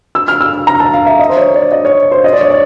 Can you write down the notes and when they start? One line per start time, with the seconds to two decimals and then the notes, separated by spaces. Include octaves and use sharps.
0.15 E6
0.28 F6
0.41 E6
0.67 A#5
0.80 A5
0.93 F5
1.06 E5
1.19 D#5
1.29 C5
1.37 C#5
1.54 D5
1.72 D#5
1.85 C#5
2.12 C5
2.24 D#5
2.33 D5
2.41 C#5
2.50 D5